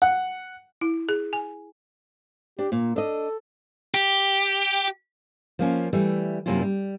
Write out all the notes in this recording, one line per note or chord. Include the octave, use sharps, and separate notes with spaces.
F#5
E4
G#4
G#5
D4 G4
A#2 A#3
D4 A4 D#5
G4
F3 A#3 C#4 F4
E3 G3 A3
F#2 C3 A#3 C#4 E4 F4
G3